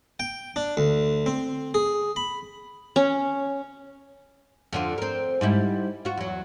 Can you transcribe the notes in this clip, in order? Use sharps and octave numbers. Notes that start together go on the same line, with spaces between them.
G5
D4
D2
C4
G#4
B5
C#4
F2 D3 F4
C4 A#4
G#2 G3 E4
F4 F#4
E2 F#3